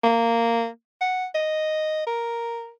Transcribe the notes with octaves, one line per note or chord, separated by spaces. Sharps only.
A#3
F#5
D#5
A#4